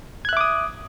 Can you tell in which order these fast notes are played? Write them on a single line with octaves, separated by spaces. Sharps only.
G#6 F#6 E5 D6 D#6